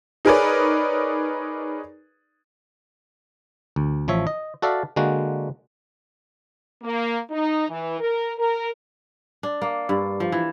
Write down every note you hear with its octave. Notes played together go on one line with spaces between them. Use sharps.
D#4 G#4 A#4 B4 C#5 D5
D2
A1 F3 C#5 E5
D#5
F#4 A4 D5 E5 F5
D3 G#3 A#3 F#4
A#3
D#4
E3
A#4
A#4
D4
A#3
G2
F3
E3